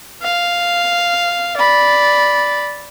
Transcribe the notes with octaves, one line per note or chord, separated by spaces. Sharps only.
F5
D5 B5